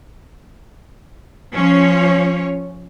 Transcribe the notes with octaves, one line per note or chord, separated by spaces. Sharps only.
F3 C#4 C#5